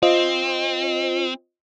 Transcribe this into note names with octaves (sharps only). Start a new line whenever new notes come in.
C4 F4 C5 D#5